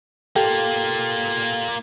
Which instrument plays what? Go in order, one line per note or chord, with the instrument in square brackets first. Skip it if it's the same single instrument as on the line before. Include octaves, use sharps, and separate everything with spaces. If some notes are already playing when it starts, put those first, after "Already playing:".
[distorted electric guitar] A#3 F4 [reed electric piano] G4 A4 G5